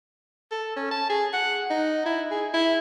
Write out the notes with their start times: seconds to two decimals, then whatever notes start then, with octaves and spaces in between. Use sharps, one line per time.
0.51 A4
0.76 C#4
0.91 A5
1.10 G#4
1.34 F#5
1.71 D#4
2.06 E4
2.31 G#4
2.54 E4